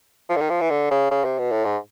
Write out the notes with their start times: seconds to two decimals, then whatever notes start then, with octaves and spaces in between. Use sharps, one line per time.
0.29 F3
0.36 D3
0.41 D#3
0.50 F3
0.61 E3
0.70 D3
0.91 C#3
1.11 C#3
1.25 C3
1.39 B2
1.52 A2
1.65 G#2